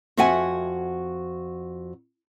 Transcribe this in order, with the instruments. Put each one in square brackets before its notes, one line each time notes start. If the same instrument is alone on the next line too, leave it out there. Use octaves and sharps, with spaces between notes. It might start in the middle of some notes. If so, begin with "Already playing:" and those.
[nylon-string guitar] F2 C4 F#4 E5 F#5 G#5